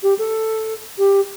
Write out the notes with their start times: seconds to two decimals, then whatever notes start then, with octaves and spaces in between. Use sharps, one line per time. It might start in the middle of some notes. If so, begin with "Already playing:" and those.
0.03 G4
0.19 A4
0.98 G4